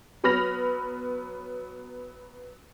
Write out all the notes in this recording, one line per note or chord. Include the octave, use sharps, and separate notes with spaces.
F#3 B3 B5 F6 A#6 F7